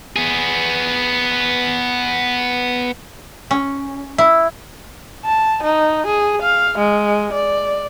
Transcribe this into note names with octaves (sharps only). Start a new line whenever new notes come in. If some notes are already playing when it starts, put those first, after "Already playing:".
B3 G#4
C#4
E4
A5
D#4
G#4
F5
G#3
D5